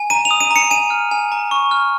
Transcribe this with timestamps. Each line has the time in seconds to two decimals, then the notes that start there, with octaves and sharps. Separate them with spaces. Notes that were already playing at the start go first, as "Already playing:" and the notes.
Already playing: G#5
0.10 A#5 D#7
0.25 F7
0.31 D#6
0.41 D#7
0.51 A#5
0.56 C#7
0.70 G#5 D#7
0.90 F6
1.11 G#5
1.32 A#5
1.51 C#6
1.71 F6